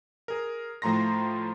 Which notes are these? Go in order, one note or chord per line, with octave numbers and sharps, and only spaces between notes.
G#4 A#4
A2 F3 A3 A#5 C6 A#6